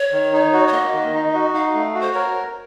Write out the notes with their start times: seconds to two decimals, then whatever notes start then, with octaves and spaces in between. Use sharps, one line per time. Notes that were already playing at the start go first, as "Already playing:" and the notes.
Already playing: C#5
0.12 D#3
0.33 D#4
0.53 F#4
0.68 C#5
0.72 A#3 D#5
0.93 D#3
1.14 D#4
1.34 F#4
1.53 D#4 F5
1.74 A3
1.95 F#4
2.01 C5
2.13 A#4 C#5